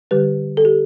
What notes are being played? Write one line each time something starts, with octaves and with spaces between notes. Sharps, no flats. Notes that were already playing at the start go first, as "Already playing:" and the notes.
D3 G3 G4 B4
A4
G4